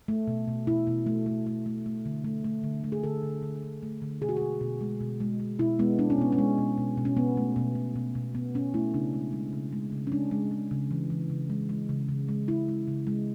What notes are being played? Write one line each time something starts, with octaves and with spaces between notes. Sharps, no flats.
A3
B2
B2
B2 E4
B2
A3
A3
A3
A3
A3
D3
A3
A3
D3
A3
G#4
D3 A4
D3
D3
D3
A3
D3
B2 G#4
F#4
B2 G#4
B2
G#3
B2
G#3
G#3
B2 E4
G#3 B3
G#3 D4
C#4
B2 B3
C#4
G#3
B2
B2
B2
C#4
B2 B3
A3
B2
B2
B2
B2
B2 B3
B2 C#4
A3 E4
C#3 D4
G#3
G#3
C#3
G#3
C#3
C#4
G#3 D4
G#3
G#3
C#3
E3
E3
C#3
G#3
G#3
C#3
C#3
G#3
G#3 E4
G#3
C#3
G#3